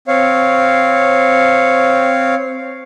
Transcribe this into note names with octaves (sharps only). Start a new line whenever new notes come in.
C4 C#5 F5